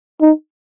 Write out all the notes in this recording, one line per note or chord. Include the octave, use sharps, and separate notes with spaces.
D#4